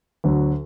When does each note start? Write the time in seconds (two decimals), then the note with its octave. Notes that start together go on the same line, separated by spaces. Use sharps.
0.24 D2 D3 F#3